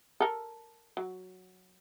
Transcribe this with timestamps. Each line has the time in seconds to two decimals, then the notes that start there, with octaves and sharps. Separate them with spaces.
0.20 A4 A#4
0.97 F#3